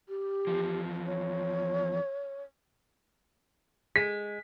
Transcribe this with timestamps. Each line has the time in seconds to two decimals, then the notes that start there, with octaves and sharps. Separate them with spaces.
0.09 G4
0.47 E2 F3
1.07 C#5
3.96 G#3 B6